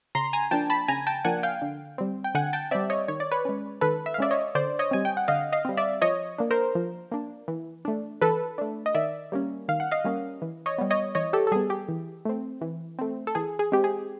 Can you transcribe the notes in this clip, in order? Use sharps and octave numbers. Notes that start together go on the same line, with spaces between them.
C#3 A#5 C6
G#5 A#5
F3 A#3 D4 G5 A5
A5 B5
C#3 G#5 A#5
G5 A5
F3 A#3 D4 F#5 G#5
F5 G5
D3
G3 C4
G5
D3 F#5 G#5
G5 A5
G3 C4 D5 E5
C#5 D#5
D#3 C#5
D5
B4 C#5
G#3 C#4
D#3 A4 B4
E5
F5
G#3 C#4 D5 E5
C#5 D#5
D3 C5 D5
C#5 D#5
G3 C4 G#5
G5
F#5
D3 D#5 F5
D#5 F5
G3 C4
D5 E5
F3 C#5 D#5
A#3 D4
A#4 C5
F3
A#3 D4
E3
A3 D4
E3 A4 B4
A3 D4
D#5
D#3 D5 E5
G3 A#3 C#4
D#3 F5
F#5
D#5 F5
G3 A#3 C#4
E3
C#5 D#5
G3 B3
C#5 D#5
E3 C#5 D#5
G4 A4
A4
G3 B3 G#4
G4
E3
A3 C4
E3
A3 C4
A4
E3 G#4
G#4
G#3 C4 G4
G#4